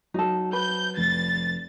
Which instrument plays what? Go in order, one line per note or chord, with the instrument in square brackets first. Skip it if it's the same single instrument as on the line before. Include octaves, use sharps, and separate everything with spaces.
[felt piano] F#3 [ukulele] D#4 A4
[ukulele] B4 [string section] G6
[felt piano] F1 [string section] A6